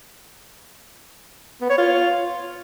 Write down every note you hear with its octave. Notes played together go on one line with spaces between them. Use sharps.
B3
C#5
F4